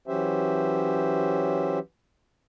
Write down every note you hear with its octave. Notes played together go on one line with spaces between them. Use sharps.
E3 F#3 C#4 G4 C5 E5